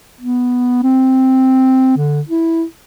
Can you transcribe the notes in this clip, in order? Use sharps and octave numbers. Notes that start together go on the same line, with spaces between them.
B3
C4
D3
E4